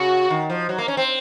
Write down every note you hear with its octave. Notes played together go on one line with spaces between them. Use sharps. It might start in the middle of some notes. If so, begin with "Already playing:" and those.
Already playing: C#3 F#4
D#3
F3
F#3
A#3
C#4
C4